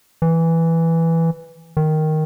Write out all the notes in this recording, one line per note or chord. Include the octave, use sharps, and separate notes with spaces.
E3
D#3